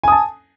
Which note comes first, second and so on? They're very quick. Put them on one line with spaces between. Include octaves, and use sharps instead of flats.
G#5 D#6 A5